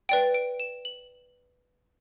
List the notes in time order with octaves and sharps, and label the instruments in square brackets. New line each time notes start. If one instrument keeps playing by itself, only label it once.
[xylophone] B4 D5 G5 D7
D7
E7
F#7